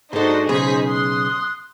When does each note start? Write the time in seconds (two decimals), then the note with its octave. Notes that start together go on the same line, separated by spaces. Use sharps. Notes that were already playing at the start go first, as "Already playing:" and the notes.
0.13 G#2 D4 D#4 F#4 A4 C5 D#5
0.49 B1 C#3 D#4 G#4 C5 B6
0.86 C6 D#6 F#6